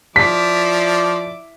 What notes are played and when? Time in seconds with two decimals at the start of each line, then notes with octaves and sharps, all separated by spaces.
0.16 F3 E4 D5 D6 B6